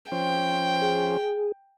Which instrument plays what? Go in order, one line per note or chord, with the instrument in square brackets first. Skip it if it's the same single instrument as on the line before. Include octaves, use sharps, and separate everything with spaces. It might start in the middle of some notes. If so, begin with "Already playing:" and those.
[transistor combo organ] F3 C#4 C5 [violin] G5
[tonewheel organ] G#4